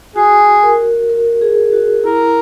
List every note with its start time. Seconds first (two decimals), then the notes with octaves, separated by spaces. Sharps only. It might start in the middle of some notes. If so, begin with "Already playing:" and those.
0.16 F#4 G#4
0.63 A#4
1.10 A#4
1.41 G#4
1.73 F#4
2.04 E4 A#4